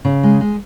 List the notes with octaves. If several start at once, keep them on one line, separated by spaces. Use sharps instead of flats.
C#3
G#3
G#3